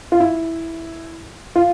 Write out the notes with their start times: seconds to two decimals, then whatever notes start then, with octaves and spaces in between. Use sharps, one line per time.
0.12 F4
0.20 E4
1.56 F4